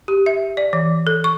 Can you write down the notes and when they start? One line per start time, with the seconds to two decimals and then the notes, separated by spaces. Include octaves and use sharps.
0.08 G4
0.26 E5
0.57 D5
0.73 E3
1.07 A4
1.24 C#6